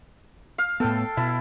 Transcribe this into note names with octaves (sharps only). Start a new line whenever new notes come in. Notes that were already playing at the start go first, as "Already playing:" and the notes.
F5
A2 B3 A4 G5
B2 E4 A5